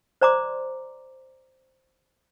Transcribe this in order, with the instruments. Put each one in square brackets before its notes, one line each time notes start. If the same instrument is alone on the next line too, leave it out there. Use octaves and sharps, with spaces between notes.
[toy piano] C5 D5 A#5 C6 D6